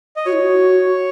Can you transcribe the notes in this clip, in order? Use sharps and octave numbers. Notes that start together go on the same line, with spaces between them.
D#5
F#4 C#5
E4
F#4